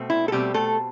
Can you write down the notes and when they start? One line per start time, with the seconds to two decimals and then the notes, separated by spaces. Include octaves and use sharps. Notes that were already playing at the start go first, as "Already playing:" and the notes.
Already playing: B2 A3 C4
0.10 E4
0.28 A4
0.32 B2 G3 A3 C4 G4
0.54 A3 A4